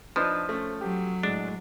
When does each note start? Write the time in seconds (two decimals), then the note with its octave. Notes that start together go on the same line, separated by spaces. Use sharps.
0.16 F3 D4 D#4 B4 C5
0.49 A3 C#4
0.81 F#3 G4
1.23 A2 G#3 D4